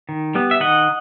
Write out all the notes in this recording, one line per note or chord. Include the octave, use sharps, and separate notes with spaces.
D#3
G3 B3
E5
D#3 D#5 F#5